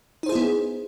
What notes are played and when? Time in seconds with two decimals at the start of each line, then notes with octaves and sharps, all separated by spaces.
0.23 D#4
0.26 C5
0.29 G#4
0.32 E4
0.35 B3